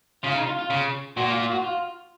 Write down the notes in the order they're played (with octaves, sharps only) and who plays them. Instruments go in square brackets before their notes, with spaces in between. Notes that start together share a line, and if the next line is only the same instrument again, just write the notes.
[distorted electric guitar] C#3 [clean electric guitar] F4
[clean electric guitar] D#4
F4
F4
[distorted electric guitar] C#3
[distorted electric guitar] A#2 [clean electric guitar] F#4
[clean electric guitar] F4
F4
F#4
F4